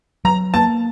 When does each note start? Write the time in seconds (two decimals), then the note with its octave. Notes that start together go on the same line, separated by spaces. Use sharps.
0.25 F#3 A#5
0.54 A#3 A5